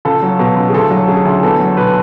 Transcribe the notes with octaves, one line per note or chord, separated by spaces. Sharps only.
C#2 A4
F#3
B2
C#2
G#4
D2 A4
F#3
C#3 G#4
D2
E2 A4
F#3
B2 B4